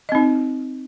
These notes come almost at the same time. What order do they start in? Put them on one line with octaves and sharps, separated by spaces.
D#5 C4 D#4